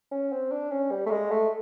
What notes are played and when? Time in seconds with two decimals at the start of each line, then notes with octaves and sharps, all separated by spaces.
0.11 C#4
0.32 C4
0.52 D4
0.71 C#4
0.91 G3
1.06 A3
1.11 G#3
1.31 A3